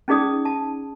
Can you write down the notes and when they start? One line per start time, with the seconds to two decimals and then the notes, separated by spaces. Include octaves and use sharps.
0.08 C#4 D#4 G#4 D5 D#6
0.45 A5